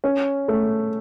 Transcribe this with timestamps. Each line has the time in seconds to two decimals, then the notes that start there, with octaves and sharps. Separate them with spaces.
0.04 C#4
0.48 A3